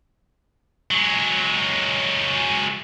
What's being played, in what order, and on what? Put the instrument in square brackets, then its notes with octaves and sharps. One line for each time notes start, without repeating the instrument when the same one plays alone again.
[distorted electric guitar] F#3 G#3